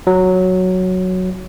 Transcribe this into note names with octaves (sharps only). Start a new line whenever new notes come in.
F#3